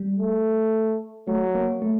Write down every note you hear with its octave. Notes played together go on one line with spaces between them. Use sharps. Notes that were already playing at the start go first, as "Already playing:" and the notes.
Already playing: G3
A3
F#3 A3
A#3
A3